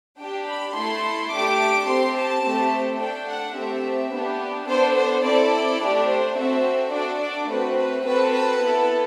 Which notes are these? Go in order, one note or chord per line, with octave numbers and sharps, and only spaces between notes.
D4 G4 G5
B5
A3 E4 A4 C6
A3 D4 G4 D6
C4 G4 C6
A5
A3 C4 G4
D4 A4 G5
F#5
A3 C4 G4 E5
B3 D4 G4
B3 D4 A4 C5
C5
C4 E4 A4 D5
A3 D4 G4
C5
C4 F#4 A4 E5
D4 F#4 A4 D5
D5
A3 C4 F#4 B4
B4
C4 F#4 A4 B4
B4
B3 E4 A4